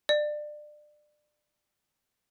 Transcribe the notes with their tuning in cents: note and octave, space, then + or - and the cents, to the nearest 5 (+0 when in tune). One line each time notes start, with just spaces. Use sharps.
D5 +25